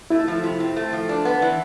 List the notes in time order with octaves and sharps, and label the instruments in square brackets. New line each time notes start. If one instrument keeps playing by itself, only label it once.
[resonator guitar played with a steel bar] A3 [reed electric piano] E4
[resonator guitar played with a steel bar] F3
C3
C4
A3
F3
D4
B3
E3